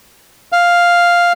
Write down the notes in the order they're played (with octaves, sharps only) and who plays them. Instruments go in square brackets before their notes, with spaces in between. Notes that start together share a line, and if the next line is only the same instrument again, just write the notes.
[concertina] F5